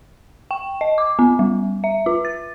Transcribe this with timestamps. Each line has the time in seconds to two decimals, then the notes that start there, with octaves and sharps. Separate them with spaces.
0.51 G5
0.81 D#5
0.98 D6
1.19 B3
1.39 G3
1.84 E5
2.06 F4
2.25 A6